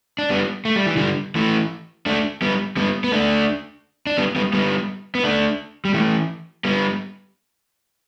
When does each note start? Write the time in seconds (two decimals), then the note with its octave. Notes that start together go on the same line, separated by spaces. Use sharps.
0.19 D4
0.30 G3 B3
0.65 A3
0.76 G3
0.86 E3
0.97 D3 G3
1.35 E3 A3
2.06 A3 D4
2.42 G3 B3
2.77 G3 B3
3.04 B3
3.12 A3 D4
4.07 D4
4.17 G3 B3
4.36 G3 B3
4.53 G3 B3
5.15 B3
5.23 A3 D4
5.85 G3
5.94 E3 A3
6.65 G3 B3